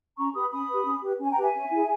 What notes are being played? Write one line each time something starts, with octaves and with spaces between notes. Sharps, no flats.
C#4 A#5 C#6
G4 B4 B5 D#6
C#4 B5 D#6
G4 B4
C#4
G4 B4
C#4 G#5
G5 A#5
G4 B4
E5 G#5
C#4
E4 G#4